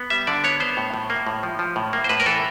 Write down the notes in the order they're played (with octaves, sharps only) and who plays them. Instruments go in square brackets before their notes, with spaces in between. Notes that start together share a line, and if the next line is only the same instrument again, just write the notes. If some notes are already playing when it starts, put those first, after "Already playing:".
Already playing: [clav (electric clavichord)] B3
G3 E5
D3 D5
B3 C#5
B3 C5
A2
A2
A#3
A2
F3
F3
A2
A#3
C5
A2 B4
A#4
E3 A4